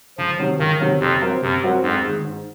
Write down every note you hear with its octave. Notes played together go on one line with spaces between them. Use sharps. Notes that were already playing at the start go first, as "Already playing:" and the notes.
C#2 F3
C3 D#3 F#3 C#4
C#2 D#3
C3 D#3 F#3 C#4
F2 C3
F#3 C4 F#4 A#4
F#2 C3
F#3 C4 F#4 A#4
F2 G#2
D#3 G#3
G#2